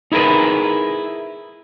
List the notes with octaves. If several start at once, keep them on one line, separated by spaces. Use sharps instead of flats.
D#4 E4 G#4 A#4 B4